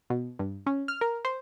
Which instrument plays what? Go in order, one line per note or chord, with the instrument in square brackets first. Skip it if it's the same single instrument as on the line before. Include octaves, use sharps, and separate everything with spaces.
[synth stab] B2
G2
C#4
F6
A#4
C5